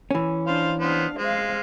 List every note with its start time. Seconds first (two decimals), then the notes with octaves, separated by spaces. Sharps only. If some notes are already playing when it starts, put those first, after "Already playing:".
0.11 E3 C#4
0.47 D4 C5 F5
0.81 B3 D4 C5 F5
1.19 G#3 C5 F5